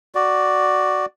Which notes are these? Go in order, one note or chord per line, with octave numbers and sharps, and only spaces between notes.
F#4 D5